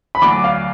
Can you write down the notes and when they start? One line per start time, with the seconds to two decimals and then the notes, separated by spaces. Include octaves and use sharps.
0.15 B5
0.21 D2 D3 F#3 D4 D6
0.44 F5